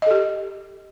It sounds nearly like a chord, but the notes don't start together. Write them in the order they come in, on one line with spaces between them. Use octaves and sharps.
D#5 A4 G4